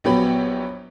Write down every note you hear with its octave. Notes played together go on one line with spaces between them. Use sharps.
A#1 F#3 B3 G4 C#5 B5